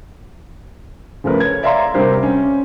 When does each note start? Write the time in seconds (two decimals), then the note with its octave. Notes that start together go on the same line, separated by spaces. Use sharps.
1.24 C#3 F3 A3 A#4 B4
1.40 C#5 G#6
1.63 D5 E5 F5 A#5 C6
1.94 C3 G3 G4 A#4 C5
2.23 C#4